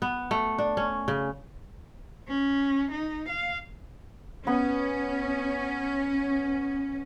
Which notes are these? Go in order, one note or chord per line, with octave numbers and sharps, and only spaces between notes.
B3
A3
D4
C#4
C#3
C#4
D#4
F5
B3 C#4